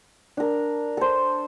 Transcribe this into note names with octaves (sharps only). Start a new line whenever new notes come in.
D4 A#4
A4 C5